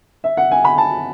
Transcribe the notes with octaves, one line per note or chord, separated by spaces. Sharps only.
E5
F#5
G#5
B5
A5